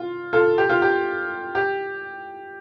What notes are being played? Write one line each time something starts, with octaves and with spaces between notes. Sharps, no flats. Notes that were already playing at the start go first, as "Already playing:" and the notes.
Already playing: F4
F4 A4
G4
F4
G4
G4